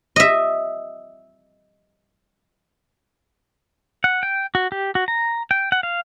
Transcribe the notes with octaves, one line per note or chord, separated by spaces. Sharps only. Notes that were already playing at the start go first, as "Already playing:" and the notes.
D#5 E5
F#5
G5
F#4
G4
F#4
A#5
G5
F#5
F5